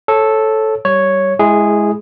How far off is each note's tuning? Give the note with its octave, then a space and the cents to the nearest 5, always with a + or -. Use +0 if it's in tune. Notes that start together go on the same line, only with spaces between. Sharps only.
A4 -5 C#5 -15
G3 -20 C#5 +0
G#3 +15 E4 +0 G#4 -10